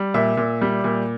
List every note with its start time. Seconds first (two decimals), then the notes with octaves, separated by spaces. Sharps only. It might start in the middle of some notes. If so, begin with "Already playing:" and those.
Already playing: G3
0.14 A#2 E5
0.37 A#2
0.62 G3
0.84 A#2